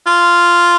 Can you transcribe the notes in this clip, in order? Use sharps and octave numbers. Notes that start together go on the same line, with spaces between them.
F4